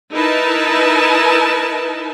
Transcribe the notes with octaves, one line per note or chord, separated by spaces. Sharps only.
D#4 E4 A#4 B4 A5